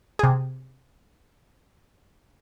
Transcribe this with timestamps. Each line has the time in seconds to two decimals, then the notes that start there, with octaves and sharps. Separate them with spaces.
0.19 C3 G#4